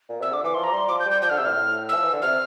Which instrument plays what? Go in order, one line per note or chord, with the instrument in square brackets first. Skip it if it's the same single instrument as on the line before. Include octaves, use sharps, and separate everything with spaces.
[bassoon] A#2
[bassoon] C3 [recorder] E6
[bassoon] D3 [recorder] D6
[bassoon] E3 [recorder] D6
[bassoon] F3 [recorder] C6
[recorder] A#5
[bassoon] G3 [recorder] C6
[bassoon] F3 [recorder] D6
[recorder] G6
[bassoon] G3
[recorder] G6
[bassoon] F3 [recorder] G6
[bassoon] D3 [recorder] F6
[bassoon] C3 [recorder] E6
[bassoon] A2 [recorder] F6
[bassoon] A2
[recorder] E6
[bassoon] F3
E3
D3
[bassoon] C3 [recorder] F6